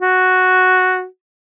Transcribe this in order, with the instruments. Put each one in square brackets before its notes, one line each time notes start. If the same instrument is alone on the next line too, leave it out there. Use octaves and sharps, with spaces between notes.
[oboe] F#4